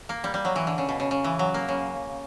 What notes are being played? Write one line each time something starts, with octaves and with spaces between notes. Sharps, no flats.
A#3
G3
G3
F#3
E3
D3
C#3
B2
C#3
C#3
E3
F#3
A#3
C#3